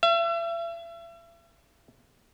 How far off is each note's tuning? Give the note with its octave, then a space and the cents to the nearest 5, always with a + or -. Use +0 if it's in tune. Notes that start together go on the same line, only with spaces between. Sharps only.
E5 +40